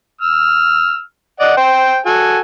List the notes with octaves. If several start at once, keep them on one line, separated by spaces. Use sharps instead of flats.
E6 F6
D5 D#5 F#5
C5 G5
F#4 A4 G#5